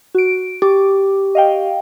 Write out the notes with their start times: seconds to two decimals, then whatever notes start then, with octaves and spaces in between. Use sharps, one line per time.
0.15 F#4 D7
0.62 G4 D6
1.35 D#5 F5 G5